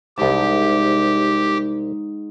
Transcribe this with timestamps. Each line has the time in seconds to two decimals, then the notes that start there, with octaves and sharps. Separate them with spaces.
0.18 C2 G#2 G4 A5